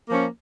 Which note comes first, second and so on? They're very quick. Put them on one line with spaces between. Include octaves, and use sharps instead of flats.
A#3 F3 C#4